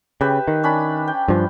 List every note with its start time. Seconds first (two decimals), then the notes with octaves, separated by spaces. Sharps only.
0.21 C#3 G4 B4 E5
0.48 D#3
0.63 C#4 D4 B5
1.08 G5
1.28 G2 F3